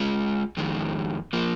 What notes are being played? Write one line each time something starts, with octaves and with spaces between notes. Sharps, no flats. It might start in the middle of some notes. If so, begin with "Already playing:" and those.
Already playing: G#3 F4 G#4
F2 D#3 G#3
F3 A#3